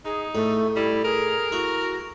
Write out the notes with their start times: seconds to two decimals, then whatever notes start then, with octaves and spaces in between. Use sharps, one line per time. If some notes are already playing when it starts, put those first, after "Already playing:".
0.05 D#4 G#4
0.35 A2 A3
0.76 G3 E4
1.04 G#4 A#4
1.52 E4 F#4